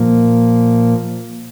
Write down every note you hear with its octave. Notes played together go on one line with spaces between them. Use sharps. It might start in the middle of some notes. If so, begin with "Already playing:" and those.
Already playing: A#2 F3 A#3